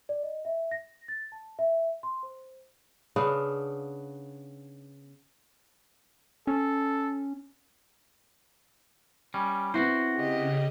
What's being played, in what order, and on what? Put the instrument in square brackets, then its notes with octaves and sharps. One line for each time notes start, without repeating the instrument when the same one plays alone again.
[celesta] D5
D#5
E5
A#6
A6
A5
E5
C6
C5
[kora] C#3 B3 D4 F5
[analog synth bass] C#4 [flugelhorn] A4
[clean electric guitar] G3 C#4
[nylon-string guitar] B3 C4 E4 [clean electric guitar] F#4 C5
[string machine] C#3 [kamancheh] G4 D#5